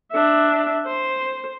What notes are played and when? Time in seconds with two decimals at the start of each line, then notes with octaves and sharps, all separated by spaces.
0.12 D4 E5
0.86 C5